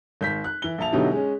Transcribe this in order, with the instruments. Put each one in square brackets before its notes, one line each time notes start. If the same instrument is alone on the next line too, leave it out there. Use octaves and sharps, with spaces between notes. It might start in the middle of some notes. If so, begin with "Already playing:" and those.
[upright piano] G#1 G6 B6
F#6
E3 G7
A#1 E5 A5 F7
B2 D3 F#3 D#4 E4 G4
G#3 C#4